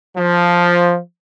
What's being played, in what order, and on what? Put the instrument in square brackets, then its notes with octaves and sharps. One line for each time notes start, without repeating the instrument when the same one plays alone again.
[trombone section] F3